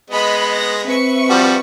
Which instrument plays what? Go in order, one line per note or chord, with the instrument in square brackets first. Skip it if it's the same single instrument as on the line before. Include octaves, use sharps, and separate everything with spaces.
[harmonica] G#3 B3 [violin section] D#5 B5
[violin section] A#6
[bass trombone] C4 [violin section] B4 E5 C#6
[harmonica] F3 G3 F#4